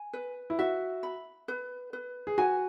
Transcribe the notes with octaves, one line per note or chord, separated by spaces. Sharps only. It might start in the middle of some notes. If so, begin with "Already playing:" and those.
Already playing: G#5
B4
E4
F#4 E5
B5
B4
B4
G#4
F#4 G#5